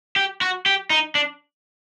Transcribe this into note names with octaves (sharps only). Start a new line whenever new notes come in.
G4
F#4
G4
D#4
D4